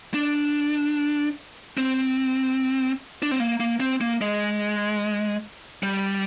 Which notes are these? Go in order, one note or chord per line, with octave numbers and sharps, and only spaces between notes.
D4
C4
D4
C4
A#3
A#3
C4
A#3
G#3
G3